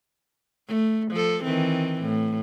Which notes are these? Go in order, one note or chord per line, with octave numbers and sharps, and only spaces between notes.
A3
F3 A4
D#3 E3 C4
A2